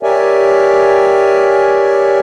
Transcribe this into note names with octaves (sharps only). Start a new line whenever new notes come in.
G4 A#4 C#5 D5 E5 G#5